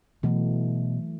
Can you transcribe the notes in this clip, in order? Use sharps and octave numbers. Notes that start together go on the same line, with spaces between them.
B2 E3 F#3 A3